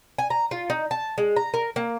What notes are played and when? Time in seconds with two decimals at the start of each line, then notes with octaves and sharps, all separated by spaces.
0.18 G#5
0.30 A#5
0.51 F4
0.70 D#4
0.91 A5
1.18 G#3
1.36 A#5
1.54 A#4
1.76 A#3